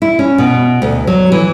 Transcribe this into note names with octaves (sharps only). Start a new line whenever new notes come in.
E4
C#4
B2
D2
F#3
E3